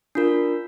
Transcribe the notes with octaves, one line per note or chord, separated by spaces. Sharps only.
D4 F4 A#4